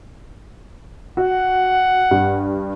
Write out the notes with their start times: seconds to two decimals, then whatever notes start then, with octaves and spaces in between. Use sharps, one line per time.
1.17 F#4 F#5
2.11 G2